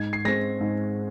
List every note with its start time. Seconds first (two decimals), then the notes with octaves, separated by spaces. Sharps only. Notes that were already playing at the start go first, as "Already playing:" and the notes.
Already playing: G#2 G#6
0.13 C7
0.25 G#3 C4 A#6
0.61 G#2